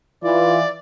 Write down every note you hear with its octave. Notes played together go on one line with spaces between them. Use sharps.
E3 F4 D5